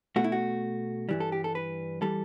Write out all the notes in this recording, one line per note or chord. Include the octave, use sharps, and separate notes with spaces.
B2 A3 F#4
E4
F#4
G2 E3 G3
A4
G4
A4
B4
E3 G3 A4